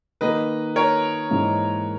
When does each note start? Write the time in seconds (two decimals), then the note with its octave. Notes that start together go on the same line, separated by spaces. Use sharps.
0.21 D#3 A#3 D#4 B4 D#5
0.76 A#4 C#5
1.31 G#2 E3 A#3 D#4